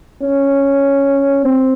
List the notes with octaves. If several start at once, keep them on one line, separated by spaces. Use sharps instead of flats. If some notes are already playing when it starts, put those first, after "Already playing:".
C#4
C4